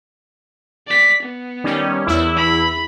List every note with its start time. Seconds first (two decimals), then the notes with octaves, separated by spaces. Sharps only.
0.87 D5 B6
1.22 B3
1.64 D#3 G3 C#4
2.07 E2 E4
2.36 B5